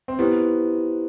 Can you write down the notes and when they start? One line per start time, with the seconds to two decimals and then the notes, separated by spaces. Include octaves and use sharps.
0.08 C4
0.19 B3 E4 G4 C5